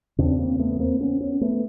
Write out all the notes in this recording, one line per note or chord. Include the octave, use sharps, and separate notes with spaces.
E2 C#3 C4 D4
A#3 C4
A3 B3
A#3 C4
B3 C#4
B3 C#4
A3 B3